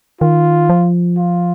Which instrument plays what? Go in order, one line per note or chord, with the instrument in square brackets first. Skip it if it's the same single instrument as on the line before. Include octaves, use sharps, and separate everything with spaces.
[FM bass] D#3 [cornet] F4
[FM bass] F3
[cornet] F4